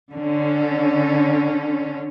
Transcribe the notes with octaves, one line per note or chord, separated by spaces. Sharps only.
D3 C#4